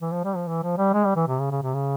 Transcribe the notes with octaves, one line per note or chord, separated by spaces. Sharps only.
E3
F3
G3
F3
E3
F3
G3
G#3
G3
E3
C3
C#3
C#3
C3
C#3